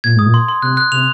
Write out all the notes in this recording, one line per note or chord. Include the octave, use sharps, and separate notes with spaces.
A#2 G#6
G#2 D#6
A#2
C6
C6
C3 F#6
F#6
C3 F7